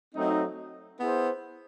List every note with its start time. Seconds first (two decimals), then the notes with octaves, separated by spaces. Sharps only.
0.15 F#3 A3 C4 D#4
0.99 B3 E4 G#4 C5